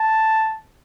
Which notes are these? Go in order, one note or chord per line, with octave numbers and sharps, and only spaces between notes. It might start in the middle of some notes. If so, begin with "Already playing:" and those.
Already playing: A5